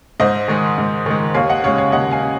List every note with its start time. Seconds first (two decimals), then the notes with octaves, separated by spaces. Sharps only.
0.20 G#2 C5 D#5
0.48 D#3 G#3
0.78 G#2
1.06 D#3 G#3
1.34 D#2 C#5 F5
1.49 D#5 F#5
1.64 C#3 G#3 C#5 F5
1.78 C#5 F5
1.92 D#2 D#5 F#5
2.11 F5 G#5
2.21 C#3